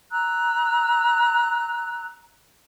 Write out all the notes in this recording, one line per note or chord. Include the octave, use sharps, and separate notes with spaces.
A#5 E6 F#6